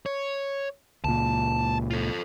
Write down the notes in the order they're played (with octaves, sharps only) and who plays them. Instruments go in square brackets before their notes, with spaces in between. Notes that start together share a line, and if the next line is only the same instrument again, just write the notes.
[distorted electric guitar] C#5
[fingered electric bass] C#2 A#2 [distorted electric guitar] A5
[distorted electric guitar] F4 A4